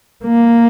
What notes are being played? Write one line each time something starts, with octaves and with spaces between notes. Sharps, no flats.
A#3